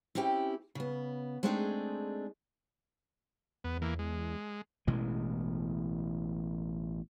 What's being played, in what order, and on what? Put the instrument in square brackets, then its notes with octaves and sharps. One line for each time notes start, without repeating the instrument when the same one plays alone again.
[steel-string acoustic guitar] C4 C#4 E4 G4 G5
C#3 B3
G#3 A3 C4 D4 D#4 G#4
[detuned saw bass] E2 [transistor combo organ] B3
[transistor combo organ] E3 A#3
G#3
[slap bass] A1 B2 E3 G#3